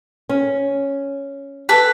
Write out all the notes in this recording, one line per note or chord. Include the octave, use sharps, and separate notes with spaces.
C#4
A4 B4 B5